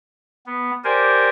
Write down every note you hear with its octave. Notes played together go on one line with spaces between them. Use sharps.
B3
G4 A#4 C5 D5 G#5